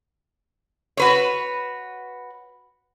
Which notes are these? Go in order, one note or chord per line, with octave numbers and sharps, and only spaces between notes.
F#4 B4 C#5